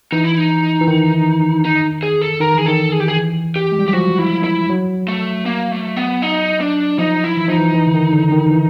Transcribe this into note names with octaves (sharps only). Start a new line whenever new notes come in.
E3 D#4
E4
D#4
E3
D#3
D#4
G#4
A4
D#3 A#4
E3 G#4
D#3 A4
G#4
G4
G#4
E3
G4
G#3
G3
F#3 G4
F3 F#4
E4
E4
F#3
A3
A#3
A3
B3
D#4
D4
F3 D#4
E4
E3
F3 D#4
E3
E3
D3
D#3
D3
D#3
E3